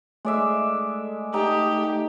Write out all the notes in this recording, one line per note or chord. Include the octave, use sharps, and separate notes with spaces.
G#3 A3 D5 E5
D#4 G4 A5